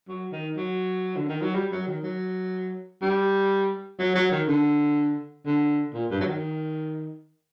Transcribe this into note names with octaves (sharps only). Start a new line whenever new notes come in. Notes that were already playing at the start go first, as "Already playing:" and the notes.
F#3
D#3
F#3
D3
D#3
F#3
G3
F#3
D#3
F#3
G3
F#3
F#3
D#3
D3
D3
A#2
G2
F#3
D#3